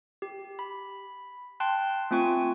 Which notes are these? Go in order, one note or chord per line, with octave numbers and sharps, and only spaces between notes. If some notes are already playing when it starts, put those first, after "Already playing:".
G4
B5
G5 A5 C6 F#6
A3 C4 F4 G#5 C#6